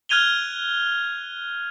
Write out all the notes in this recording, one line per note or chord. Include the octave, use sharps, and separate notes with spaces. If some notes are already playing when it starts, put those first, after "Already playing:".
F6 F#6 G#6 D#7 F7 G7